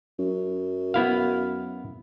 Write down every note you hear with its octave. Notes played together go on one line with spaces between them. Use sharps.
F#2
B3 E4 F5